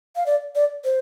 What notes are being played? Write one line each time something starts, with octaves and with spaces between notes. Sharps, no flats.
F5
D5
D5
C5